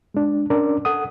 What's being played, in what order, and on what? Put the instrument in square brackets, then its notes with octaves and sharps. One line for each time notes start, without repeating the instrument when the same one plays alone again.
[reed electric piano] G#3 D4
C#4 D4 A#4 D5
A4 F#5 D#6